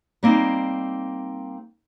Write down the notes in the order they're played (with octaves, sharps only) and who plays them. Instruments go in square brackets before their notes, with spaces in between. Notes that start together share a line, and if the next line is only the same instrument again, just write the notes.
[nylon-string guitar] G3 A#3 C4 D#4